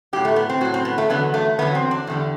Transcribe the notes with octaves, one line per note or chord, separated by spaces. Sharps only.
A2 F#3 G4
A3
B3
C4
A2 F#3 F#4
C4
B3
A3
E2 D3 F#3 B3
A3
E2 D3 F#3 B3
C4
D4
E2 D3 G3